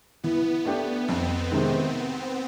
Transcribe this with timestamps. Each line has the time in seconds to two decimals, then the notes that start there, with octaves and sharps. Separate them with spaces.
0.24 E3 B3
0.65 A3 D4 G4
1.08 F2 C4
1.51 C3 D#3 G#3